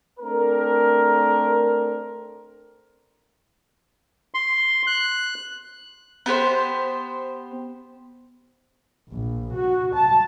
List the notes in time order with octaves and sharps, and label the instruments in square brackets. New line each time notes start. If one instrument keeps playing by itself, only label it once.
[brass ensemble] A3 C4 D4 A#4
[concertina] C6
F#6
[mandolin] B3 G4 B4 C5
[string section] A#1
F#4
A5